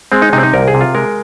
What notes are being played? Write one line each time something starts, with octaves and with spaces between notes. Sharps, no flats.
G#3 C4
D#4
C3 D#4
C4
D#4
C2 A#4
G#4
C3
F4
G#3 A#4